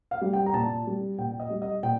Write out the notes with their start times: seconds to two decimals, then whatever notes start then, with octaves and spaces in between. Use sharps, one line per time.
0.11 F5
0.21 G3
0.33 G5
0.46 A#5
0.54 A#2 A5
0.87 G3
1.18 A#2 G5
1.40 D#5
1.50 G3
1.62 D#5
1.83 A#2 G5